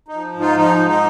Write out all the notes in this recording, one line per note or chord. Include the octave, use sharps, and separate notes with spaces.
F3 D#4
G#2
D#4 F4
F3 D#4
G#2
D#4